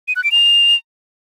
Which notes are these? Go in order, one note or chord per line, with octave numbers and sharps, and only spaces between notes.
D#7
F#6
D7
F7